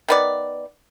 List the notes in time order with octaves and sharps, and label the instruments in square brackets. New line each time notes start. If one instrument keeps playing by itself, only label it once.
[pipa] D#3 B3 D5